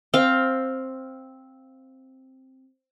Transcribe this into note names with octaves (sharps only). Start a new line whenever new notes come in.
C4 F5